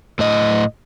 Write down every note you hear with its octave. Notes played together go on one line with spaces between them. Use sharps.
A2 D#5